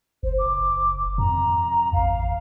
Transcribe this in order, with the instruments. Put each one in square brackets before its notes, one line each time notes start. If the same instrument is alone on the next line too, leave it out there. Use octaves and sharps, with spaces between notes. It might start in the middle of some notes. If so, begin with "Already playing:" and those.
[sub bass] F#1 [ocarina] C5
[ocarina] D6
[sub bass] F2 [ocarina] A#5
[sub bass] A1 [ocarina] F5